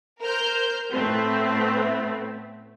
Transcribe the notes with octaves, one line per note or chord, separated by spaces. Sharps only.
A#4 C5 F6 G6
A2 A3 B3 C4